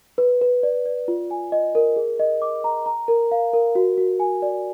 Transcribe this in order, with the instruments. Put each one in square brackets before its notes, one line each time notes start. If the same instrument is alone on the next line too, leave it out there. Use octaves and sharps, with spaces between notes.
[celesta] B4
B4
D5
D5
F4
G#5
D#5
A#4
G#4
D#5
D6
A#5
A#5
A#4
F5
A#4
F#4
F#4
G#5
D5